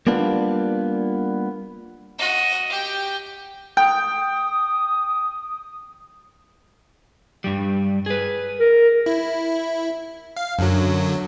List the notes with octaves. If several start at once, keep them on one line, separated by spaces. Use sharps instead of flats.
G3 A#3 B3 D4 F4
F#4 D#5
G4 G5
G5 D#6
G2 G3
G#4 B4
A#4
E4
F5
F#2 D3 F#3